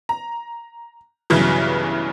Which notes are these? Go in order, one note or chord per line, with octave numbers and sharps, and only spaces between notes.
A#5
B1 G2 C#3 E3 F#3